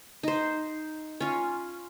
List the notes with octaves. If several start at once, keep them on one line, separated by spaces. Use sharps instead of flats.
D#4 C5
C#4 F4